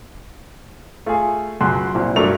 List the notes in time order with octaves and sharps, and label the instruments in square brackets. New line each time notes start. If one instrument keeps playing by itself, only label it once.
[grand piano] A3 G#4 [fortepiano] F4
[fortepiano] C#2 F#2 [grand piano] C6 F#6
[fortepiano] C2 A#2
[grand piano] G2 A3 F7 [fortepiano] F#3 A#4 D5